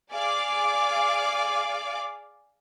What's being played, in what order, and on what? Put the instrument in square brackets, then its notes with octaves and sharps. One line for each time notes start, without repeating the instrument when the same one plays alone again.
[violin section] G#4 D5 F5 D6